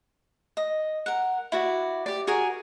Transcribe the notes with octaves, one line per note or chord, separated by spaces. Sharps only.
D#5
A#4 F#5
E4 F#4 D5
G4 D5
F#4 G#4 A#4 G#5